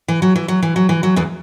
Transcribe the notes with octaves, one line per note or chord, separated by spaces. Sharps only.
E3
F#3
E3
F#3
E3
F#3
E3
F#3
E2 E3